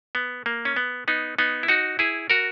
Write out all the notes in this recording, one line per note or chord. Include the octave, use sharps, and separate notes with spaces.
B3
A#3
C#4
B3
B3 D#4
B3 D#4
E4
D#4 F#4
E4 G#4
F#4 A#4